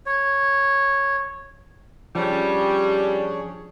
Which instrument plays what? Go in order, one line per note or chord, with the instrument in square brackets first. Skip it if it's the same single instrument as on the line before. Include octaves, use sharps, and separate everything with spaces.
[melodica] C#5
[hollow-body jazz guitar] F3 [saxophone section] G3 [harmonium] C#4 G#4 C#5 [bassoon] D4